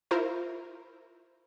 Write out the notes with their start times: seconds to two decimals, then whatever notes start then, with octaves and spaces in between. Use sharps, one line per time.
0.11 E4 F4 A#4 C5